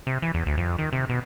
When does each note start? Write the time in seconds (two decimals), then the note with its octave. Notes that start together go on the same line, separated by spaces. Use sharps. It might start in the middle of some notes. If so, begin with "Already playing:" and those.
0.07 C3
0.22 E3
0.34 E2
0.46 D2
0.58 F2
0.79 D#3
0.93 C3
1.09 B2